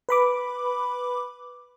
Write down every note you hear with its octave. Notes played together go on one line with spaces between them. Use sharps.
B4 B5 D6